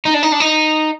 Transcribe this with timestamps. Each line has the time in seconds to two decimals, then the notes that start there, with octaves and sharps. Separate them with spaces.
0.05 D#4
0.14 D4
0.23 D#4
0.32 D4
0.40 D#4